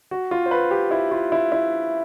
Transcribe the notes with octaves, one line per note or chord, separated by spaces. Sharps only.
F#4
F4
C5
B4
G4
E4
F4
E4
E4